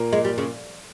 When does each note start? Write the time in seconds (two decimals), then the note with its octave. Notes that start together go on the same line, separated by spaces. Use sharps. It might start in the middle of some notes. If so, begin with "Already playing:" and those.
Already playing: A#2 A#3
0.13 G#3
0.25 G3
0.38 C#3